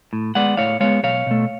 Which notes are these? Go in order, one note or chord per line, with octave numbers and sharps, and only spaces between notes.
A2
G#3 B3 D5 F#5
A2 C#5 F5
G#3 B3 C#5 F5
B1 C#5 F5
B2 A3